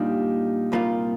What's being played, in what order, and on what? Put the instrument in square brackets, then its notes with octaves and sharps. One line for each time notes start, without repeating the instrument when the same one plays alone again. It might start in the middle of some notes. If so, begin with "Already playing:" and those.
Already playing: [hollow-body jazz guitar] A#2 G3 D4 [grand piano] D#4 F4
[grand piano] G4
[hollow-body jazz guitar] C2 A#2 G3 A#3 F4